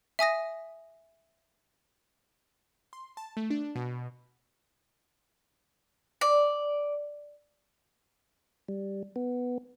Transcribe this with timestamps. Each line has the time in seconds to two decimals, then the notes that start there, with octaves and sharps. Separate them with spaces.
0.19 E5 G#5 D#6 A#6
2.93 C6
3.17 A5
3.37 A3
3.50 D4
3.76 B2
6.21 D5
8.69 G3
9.16 B3